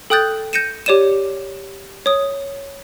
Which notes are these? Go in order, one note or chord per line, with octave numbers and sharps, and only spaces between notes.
A4 G5 D#6 F#6 G6 A6
G6 A#6 C#7 D#7 E7
G4 C#5 D5 D#7 E7
C#5 D#6